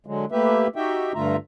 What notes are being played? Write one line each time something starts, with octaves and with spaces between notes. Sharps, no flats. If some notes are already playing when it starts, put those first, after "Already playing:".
D3 F#3 G#3
A3 A#3 G4 B4 E5
D#4 F#4 G4 E5 G5
G2 D3 A3 F4 E5 A#5